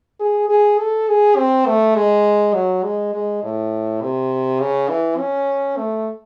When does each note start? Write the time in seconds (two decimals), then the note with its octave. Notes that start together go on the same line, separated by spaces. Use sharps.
0.20 G#4
0.49 G#4
0.78 A4
1.08 G#4
1.36 C4
1.66 A3
1.95 G#3
2.54 F#3
2.84 G#3
3.13 G#3
3.43 A2
4.01 C3
4.60 C#3
4.89 E3
5.18 C#4
5.77 A3